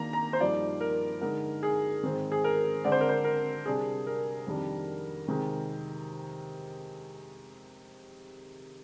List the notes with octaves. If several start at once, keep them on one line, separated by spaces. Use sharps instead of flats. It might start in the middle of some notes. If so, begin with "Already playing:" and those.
Already playing: D#3 A#3 D4 A#5
A#5
C5
G2 F3 A#3 D#4 D5
A#4
D3 G#3 D#4 A#4
G#4
G#2 D#3 G#3 C4
G#4
A#4
D3 G#3 C4 D5
C5
A#4
C5
A#4
C3 G3 D4 G#4
A#4
F2 D#3 G3 D4
C3 D#3 G#3